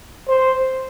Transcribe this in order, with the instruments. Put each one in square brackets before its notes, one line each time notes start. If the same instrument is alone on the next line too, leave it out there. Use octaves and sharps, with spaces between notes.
[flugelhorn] C5